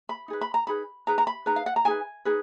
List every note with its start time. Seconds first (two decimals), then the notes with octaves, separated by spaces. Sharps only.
0.09 B5
0.28 D#4 G#4 B4
0.41 B5
0.54 A#5
0.67 D#4 G#4 B4 B5
1.07 D#4 G#4 B4 A#5
1.18 A#5
1.27 B5
1.46 D#4 G#4 B4 A#5
1.56 F5
1.66 F#5
1.76 A#5
1.85 D#4 G#4 B4 G#5
2.25 D#4 G#4 B4